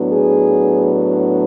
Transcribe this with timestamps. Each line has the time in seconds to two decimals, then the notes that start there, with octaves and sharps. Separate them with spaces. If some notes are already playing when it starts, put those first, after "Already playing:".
Already playing: A2 F#3 B3 D4
0.12 G#4